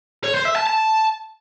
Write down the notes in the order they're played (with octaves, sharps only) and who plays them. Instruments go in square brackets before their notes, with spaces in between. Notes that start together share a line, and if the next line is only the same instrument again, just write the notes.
[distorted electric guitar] C#5
C5
E5
A5
A5